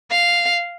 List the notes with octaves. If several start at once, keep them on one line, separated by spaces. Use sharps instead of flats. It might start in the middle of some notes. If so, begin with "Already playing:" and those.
F5